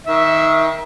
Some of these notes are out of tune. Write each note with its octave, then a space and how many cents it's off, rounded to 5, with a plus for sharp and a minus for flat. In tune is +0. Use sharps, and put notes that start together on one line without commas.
D#3 +25 E5 +0